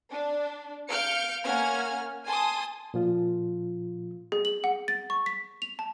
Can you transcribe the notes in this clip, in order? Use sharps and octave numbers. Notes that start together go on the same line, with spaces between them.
D4
F5 F6 G6 C#7 D7
A#3 C#4 F#5 F6 G#6
G#5 A5 C6 D#6
A#2 F3 F4
G#4
F#7
F#5
A6
C#6
B6
F7
A5